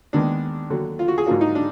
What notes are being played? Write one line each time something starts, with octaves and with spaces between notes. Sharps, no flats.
D#2 D#3 G#3 B3 D4
D#2 D3 F#3
F4
F#4
G#4
G#2 F#3 A#3 D4 F4
D#4
D4